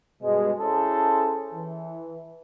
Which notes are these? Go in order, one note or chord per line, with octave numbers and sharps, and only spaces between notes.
G2 B2 G#3
C#4 E4 G#4 A4 C5
E3